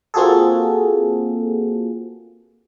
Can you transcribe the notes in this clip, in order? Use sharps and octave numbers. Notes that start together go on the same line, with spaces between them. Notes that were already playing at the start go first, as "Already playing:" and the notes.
A#3 C4 F4 F#4 G#4 A4